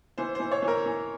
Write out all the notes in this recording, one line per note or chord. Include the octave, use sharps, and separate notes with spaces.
E3 C5
E3 C5
C#5
E3
A#4
E3